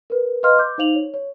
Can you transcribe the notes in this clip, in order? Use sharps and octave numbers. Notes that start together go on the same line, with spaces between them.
A#4 B4
B4 D#5 F5 C6 F6
D6 G6
D#4 C5 F5 F7 F#7
C#5
C#5